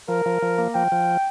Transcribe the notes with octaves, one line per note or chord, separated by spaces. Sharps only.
F3 A#4
F3
F3
A#3
F3 G5
F3